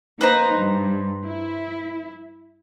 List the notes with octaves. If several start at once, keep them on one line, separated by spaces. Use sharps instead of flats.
A#3 D#4 B4 C5 A#5
G2
E4